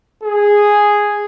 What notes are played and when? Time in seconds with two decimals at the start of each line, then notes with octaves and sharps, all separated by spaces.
0.23 G#4